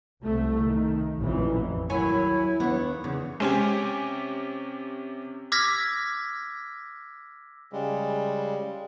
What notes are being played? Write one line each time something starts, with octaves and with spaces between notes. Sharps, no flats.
C2 C3 A3
D#3
A1 F2 A#2 E3
D#2 F#3 E4 G#5
D#2 B3 D4 C#5
E2 C#3
C3 G#3 C4 C#4 G4 G#5
D6 E6 F6 G#6 A#6 B6
C#3 G3 G#3